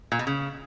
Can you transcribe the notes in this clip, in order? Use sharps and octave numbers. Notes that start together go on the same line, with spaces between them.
A#2
B2
C#3